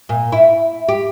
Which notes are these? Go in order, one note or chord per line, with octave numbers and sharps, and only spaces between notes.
A#2
E4
G4